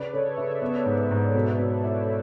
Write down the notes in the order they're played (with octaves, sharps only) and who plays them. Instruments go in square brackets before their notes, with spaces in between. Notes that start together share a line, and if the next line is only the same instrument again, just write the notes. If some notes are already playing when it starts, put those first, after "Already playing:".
Already playing: [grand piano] C#3 [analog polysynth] B4 D5
[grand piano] C#3 [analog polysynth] A4 C#5
[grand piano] C#3 [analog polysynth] C#5 E5
[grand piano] B3 [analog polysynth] C#5 E5
[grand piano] G#2
G#2
B2
B2
E4